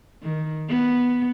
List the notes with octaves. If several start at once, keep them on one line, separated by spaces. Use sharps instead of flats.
D#3
B3